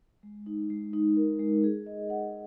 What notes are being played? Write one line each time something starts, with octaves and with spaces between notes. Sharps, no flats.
G#3
D#4
G#3
D#4
A#4
G#3
G#4
D#5
F#5